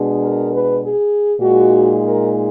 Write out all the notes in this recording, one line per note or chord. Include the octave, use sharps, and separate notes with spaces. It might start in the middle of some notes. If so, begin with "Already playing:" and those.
Already playing: B2 G#3 D4
A#4
B4
G#4
A#2 G#3 D#4 F#4
A#4